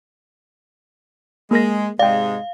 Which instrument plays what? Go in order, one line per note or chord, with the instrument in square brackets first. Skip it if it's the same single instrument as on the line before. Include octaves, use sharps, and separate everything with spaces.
[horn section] G#3 [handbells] A#3 A#4 A#6
[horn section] G#2 C3 G#3 [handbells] D5 G5 [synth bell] F5